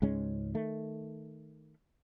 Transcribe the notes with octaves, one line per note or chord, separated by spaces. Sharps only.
C#2 G#2 G#3 C#4
D#3 A3